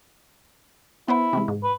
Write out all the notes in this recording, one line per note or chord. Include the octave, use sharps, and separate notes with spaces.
B3 E4 B4 C5
C3 E3 G#3
G#2
B4